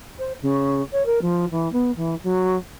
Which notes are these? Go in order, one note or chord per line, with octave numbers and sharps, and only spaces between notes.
C5
C#3
C#5
A#4
F3
E3
B3
E3
F#3